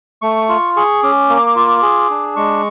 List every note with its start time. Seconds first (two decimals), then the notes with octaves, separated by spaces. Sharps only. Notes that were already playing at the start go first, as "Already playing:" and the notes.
0.22 A3 C#6
0.49 F4
0.76 G#4 C#6
1.03 C#4 D6
1.29 A#3
1.56 F4
1.82 G#4
2.10 D4
2.36 G#3 C#6